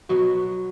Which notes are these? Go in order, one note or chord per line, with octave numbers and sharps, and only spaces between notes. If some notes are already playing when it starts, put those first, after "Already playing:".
B2 F#3 B3 F#4